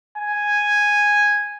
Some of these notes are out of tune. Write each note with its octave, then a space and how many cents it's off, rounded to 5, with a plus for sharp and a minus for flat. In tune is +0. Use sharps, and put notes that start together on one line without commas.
G#5 -5